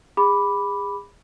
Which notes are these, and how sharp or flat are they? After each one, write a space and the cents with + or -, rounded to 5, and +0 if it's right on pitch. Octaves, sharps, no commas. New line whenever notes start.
G#4 -30 B5 +0 D6 +0